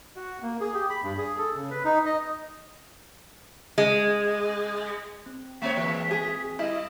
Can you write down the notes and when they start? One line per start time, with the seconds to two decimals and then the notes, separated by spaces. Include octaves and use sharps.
0.16 F#4
0.43 A#3
0.61 G#4
0.74 G4
0.90 B5
1.03 G2
1.18 G#4
1.38 A4
1.55 C#3
1.71 B4
1.85 D#4
2.06 D#5
3.78 G#3
5.26 C4
5.62 G#3 A#3 C4 C#5 E5 G5 B6
5.77 E3 G#3 C4 F#4 B4
6.11 G#4
6.59 G3 E4 D#5